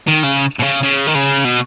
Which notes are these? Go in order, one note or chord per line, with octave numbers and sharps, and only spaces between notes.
D#3
C#3
B2
C#3
C#3
D#3
C#3
B2